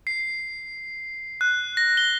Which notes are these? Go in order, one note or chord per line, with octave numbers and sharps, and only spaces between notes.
C7
F#6
A#6
G7